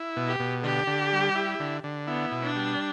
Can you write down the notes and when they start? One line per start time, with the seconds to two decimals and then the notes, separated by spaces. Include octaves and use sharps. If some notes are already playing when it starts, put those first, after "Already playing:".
Already playing: E4
0.16 B2
0.27 G4
0.40 B2
0.64 D3 G4
0.87 D3
1.12 G3
1.35 E4
1.60 D3
1.84 D3
2.07 B3 E4
2.32 B2
2.43 D4
2.56 G3